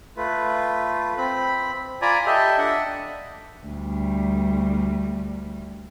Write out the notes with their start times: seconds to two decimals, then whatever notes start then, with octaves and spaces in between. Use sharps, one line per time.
0.17 A3 F4 B4
1.18 C4 B5
2.02 F4 D5 G#5 A#5 B5
2.26 G4 A4 D#5 E5
2.58 D4 E5 F#5
3.67 D2 G3